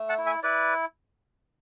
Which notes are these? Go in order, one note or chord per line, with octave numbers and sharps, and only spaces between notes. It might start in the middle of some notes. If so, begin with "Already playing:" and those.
Already playing: A3
F#5 A5
E4
E5 G#5
E4 B4 D5